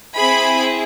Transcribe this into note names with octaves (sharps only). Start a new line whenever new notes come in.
C4 E4 G#4 B5